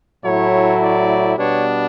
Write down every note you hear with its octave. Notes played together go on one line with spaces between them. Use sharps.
A2 F#3 A3 E4 C#5
D5
B2 G3 B3 D4 C#5